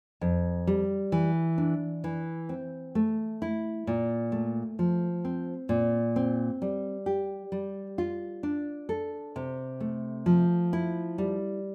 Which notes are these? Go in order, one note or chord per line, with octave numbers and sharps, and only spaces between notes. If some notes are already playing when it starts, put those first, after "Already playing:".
F2
G3
E3
D4
E3
C4
A3
E4
A#2
A3
F3
C4
A#2
C4
G3
G4
G3
F4
D4
A4
C3
A3
F3
E4
G3